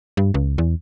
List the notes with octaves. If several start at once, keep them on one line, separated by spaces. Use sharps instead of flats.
G2
C#2
E2